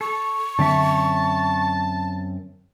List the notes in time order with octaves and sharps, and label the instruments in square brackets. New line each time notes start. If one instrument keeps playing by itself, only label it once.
[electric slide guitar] A4 [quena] C#6
[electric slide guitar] F#2 C4 E5 [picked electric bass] D3 [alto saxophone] A5